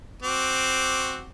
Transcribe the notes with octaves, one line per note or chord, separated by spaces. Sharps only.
C4 F#4 D6